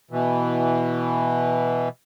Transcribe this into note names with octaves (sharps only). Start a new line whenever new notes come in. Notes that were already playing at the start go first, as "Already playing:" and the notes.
B2 E3